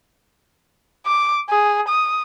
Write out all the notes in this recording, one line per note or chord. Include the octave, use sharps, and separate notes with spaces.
D6
G#4
D#6